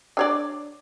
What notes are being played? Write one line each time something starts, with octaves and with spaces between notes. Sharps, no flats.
D4 C#5 D5